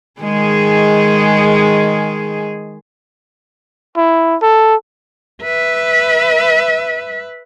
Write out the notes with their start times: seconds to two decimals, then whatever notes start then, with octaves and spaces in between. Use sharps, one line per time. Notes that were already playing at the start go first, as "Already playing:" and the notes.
0.21 D#3 G#3 G#4
3.97 E4
4.42 A4
5.43 B4 E5